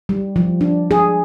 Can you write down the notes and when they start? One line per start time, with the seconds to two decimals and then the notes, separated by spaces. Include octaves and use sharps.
0.09 G3
0.36 F3
0.61 D4
0.91 G#4